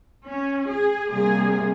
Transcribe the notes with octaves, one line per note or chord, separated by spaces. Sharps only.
C#4
G#4
C3 G3 A#3 G#4